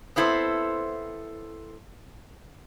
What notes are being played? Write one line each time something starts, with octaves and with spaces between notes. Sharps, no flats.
B3 C4 E4 A4 C5